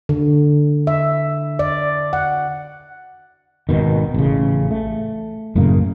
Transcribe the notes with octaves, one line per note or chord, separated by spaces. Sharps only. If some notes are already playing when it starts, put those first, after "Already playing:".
D3
E5
D5
F#5
G#1 B2 D#3
A1 C#3
A3
F#2 A2 C#3 A#3